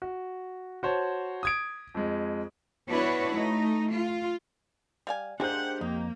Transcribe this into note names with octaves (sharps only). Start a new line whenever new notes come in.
F#4
F#4 C5 C#5 A5
D#6 G#6 D7
F2 G#3
B3 D4 E4 F#4 B4 C#5
A3 D#4
F4
G3 F5 G#5
G#3 A#3 D4 G4 G#4 C5 F#5 G6
F2 A#3 D#4